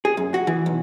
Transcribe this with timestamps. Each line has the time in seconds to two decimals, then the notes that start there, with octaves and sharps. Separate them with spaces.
0.05 G#4
0.17 F#2
0.34 F#4
0.47 E3
0.66 B1